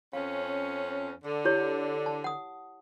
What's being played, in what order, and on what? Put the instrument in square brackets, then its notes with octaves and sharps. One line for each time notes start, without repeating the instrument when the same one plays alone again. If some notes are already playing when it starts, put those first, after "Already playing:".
[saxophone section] F2 C#4 [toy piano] F5
[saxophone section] D3
[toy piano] E4 G4 C#5
A5
F#5 D#6